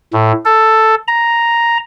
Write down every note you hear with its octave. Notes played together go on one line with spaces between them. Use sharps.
A2
A4
A#5